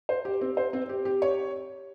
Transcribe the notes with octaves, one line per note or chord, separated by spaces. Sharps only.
C5
G4
C4
C5
C4
G4
G4
C#5